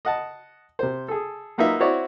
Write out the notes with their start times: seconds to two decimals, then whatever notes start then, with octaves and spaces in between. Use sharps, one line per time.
0.05 D#5 F#5 A5
0.79 C3 C5
1.08 G#4 A4
1.58 F#3 A#3 D#4 F4 B4 E5
1.80 C4 E4 F#4 C#5 D5